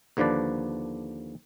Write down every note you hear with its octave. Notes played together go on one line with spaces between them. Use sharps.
D#2 D3 F3 D4 B4 D5